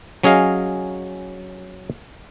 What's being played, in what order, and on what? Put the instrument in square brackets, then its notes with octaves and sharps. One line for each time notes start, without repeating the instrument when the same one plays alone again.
[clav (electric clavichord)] F#3 C#4 G#4 D#5 F5